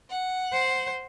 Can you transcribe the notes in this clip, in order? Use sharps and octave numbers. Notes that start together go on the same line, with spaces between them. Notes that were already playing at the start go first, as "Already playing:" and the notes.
F#5
C5